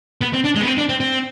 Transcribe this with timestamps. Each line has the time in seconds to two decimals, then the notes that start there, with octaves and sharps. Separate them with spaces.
0.21 B3
0.33 C4
0.44 D4
0.55 G#3
0.61 B3
0.67 C4
0.78 D4
0.89 C4
1.00 C4